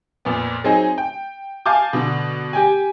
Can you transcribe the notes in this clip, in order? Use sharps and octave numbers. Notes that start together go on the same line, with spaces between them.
F2 A#2 B3
F#3 C4 D#4 G#4
G5
F5 G#5 A5 D6 G6
B2 D3
G4 G5 G#5